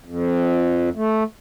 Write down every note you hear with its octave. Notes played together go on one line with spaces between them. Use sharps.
F2
A3